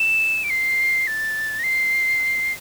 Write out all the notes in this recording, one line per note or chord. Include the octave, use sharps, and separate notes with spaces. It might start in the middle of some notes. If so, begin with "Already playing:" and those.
Already playing: E7
D7
C7
A6
A#6
C7